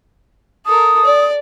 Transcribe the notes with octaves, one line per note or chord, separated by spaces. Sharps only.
A4 A#4 D#6
D5